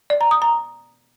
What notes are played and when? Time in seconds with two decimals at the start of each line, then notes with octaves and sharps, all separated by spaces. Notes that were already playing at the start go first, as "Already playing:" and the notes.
0.10 D5
0.21 A#5
0.31 D#6
0.42 A#5